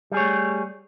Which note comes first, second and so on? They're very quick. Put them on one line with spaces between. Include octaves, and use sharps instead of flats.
G3 G#4 C#5 A3